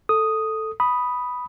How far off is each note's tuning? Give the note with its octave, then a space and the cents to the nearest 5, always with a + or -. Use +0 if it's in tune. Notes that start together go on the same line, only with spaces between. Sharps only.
A4 +0 D#6 +0
B5 +0 D#6 +0